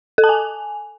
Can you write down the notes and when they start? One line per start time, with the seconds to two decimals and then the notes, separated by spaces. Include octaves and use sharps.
0.18 A4
0.24 A5
0.29 G#5